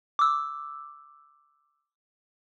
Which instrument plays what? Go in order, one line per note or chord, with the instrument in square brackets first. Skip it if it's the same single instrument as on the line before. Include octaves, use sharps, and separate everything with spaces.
[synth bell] D6 E6